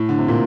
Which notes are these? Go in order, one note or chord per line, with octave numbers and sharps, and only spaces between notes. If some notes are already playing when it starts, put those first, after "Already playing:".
Already playing: A2
D3
C3
A#2